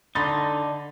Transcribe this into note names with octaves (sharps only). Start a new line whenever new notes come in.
D3 D#4 B5 C6 A6